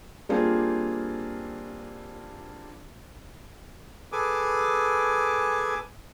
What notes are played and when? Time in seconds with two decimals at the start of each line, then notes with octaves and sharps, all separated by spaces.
0.29 G3 A#3 C4 D4 F4 G#4
4.12 G#4 A4 B4 G#5 D6